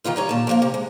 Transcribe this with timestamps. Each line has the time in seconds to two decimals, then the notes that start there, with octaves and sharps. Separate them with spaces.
0.04 D#3 E3 F4 B4
0.16 G3 D#4 C#5
0.29 A#2 A5
0.47 A2 F3 A#3
0.62 C3
0.74 G#3